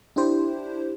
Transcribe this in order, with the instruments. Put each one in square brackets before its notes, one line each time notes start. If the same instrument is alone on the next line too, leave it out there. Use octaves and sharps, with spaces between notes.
[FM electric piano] D4 E4 G4 C5